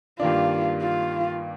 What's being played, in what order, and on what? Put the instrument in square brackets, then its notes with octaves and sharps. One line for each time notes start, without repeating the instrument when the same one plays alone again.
[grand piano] G2 D#3 A#3 D4 [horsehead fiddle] F4
[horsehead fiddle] F4